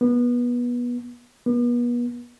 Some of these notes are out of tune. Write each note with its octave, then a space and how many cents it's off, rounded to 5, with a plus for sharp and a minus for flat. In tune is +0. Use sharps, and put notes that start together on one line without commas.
B3 -25
B3 -40